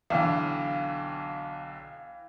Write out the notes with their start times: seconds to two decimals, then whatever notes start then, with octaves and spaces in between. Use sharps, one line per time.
0.10 B1 D3 E3 F5 G5